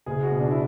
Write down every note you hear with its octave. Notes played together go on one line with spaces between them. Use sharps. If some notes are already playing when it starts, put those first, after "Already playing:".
F#1 G#4
F#4
B2
D4
E4